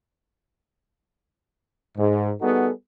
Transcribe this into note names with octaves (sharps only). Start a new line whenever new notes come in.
G#2
G3 B3 D#4 F#4 G#4 A4